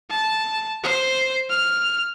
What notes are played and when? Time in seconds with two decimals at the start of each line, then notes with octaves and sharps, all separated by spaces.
0.11 A5
0.84 C5
1.50 F6